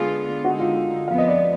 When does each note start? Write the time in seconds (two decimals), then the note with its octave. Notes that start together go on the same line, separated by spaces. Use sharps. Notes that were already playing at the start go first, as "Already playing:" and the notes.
Already playing: D3 G#3 B3 F4 G#4
0.45 D3 G#3 D#4 F#4
0.59 F4
1.08 F2 F3 B3 F5
1.18 D#5
1.28 D5
1.38 D5